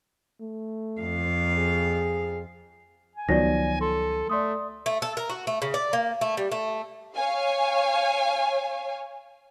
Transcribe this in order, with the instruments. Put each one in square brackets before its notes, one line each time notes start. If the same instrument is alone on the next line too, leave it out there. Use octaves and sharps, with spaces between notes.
[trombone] A3
[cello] F2 F5
[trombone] G#4
[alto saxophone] G#5
[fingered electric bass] C#2 B3 [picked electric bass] D#3 F3 F#3 [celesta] D5 A#6
[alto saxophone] A4 [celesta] C6
[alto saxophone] A3 [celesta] D5 C6 D#6
[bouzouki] A3
A4
A#4
F#4
A3
C#3
D5
A#3
A3
G3
A3
[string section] C#5 F5 G#5